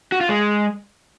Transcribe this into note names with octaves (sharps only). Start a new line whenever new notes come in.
F#4
F4
G#3